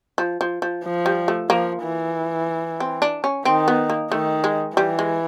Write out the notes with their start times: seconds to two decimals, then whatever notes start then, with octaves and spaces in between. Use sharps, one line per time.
0.18 F3
0.41 F3
0.62 F3
0.84 F3
1.06 G3
1.28 A3
1.49 F3 A#3
1.83 E3
2.80 C4
3.02 D4
3.24 C#4
3.45 D#3 C4
3.68 B3
3.90 A#3
4.12 D#3 A3
4.44 G#3
4.77 E3 G3
4.99 G#3